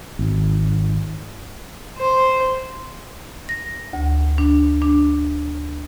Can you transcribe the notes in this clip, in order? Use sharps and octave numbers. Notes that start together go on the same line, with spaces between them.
G#1
C5
A#6
D2
D4
D4